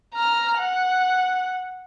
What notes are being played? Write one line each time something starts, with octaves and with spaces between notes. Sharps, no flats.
A#5 F6
F#5